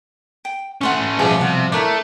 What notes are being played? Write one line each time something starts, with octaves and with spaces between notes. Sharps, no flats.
G5
A3 C#4 F#5 C6 C#6
B2 F3 G3 G#4 C#5
C3 F#5
A3 D4 E4 A#4 C#5